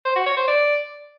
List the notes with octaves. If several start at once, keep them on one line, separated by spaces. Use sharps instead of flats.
C5
F#4
C#5
C5
D5